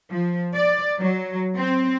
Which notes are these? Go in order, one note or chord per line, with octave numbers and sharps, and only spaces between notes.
F3
D5
F#3
C4